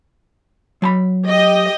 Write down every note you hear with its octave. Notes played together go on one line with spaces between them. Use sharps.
F#3 A5 B5
G4 D#5